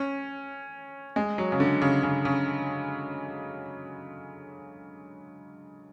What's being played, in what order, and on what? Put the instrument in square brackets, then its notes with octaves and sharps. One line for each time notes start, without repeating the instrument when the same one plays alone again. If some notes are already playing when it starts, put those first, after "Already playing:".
Already playing: [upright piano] C#4
G#3
F#3
C#3
D3
C#3
C#3
C#3